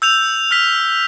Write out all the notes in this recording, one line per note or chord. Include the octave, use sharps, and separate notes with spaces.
E6 G6 F7
F6 B6